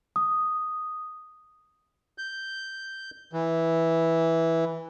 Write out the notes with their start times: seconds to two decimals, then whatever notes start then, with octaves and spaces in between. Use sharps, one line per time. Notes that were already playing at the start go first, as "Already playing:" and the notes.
0.16 D#6
2.18 G6
3.33 E3